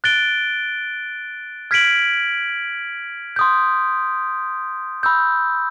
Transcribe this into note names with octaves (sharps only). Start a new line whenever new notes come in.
F#6 A6 D7 G7
F6 G#6 B6 D7 F#7
C6 D#6 G6
B5 E6 G6